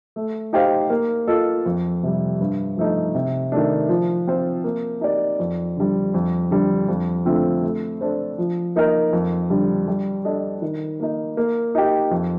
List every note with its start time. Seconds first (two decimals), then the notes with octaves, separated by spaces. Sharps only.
0.16 A3
0.53 D#4 G4 C5 F5
0.90 A#3
1.27 F4 A4 D#5
1.66 F2
2.03 C3 G3
2.41 G2
2.77 F3 A3 D#4
3.14 C3
3.52 D#3 A3 D4
3.89 F3
4.27 C4 F4 C5
4.64 A#3
5.01 D#4 G4 D5
5.39 F2
5.77 D3 G3
6.14 F2
6.51 D3 G3
6.88 F2
7.25 D3 A3 C4 F4
7.63 A3
8.01 D4 A4 C5
8.38 F3
8.76 A#3 D#4 A#4
9.13 F2
9.50 D3 G3
9.88 G3
10.25 D4 A4 D#5
10.62 D#3
11.00 A#3 D#4
11.37 A#3
11.75 D#4 G4
12.11 F2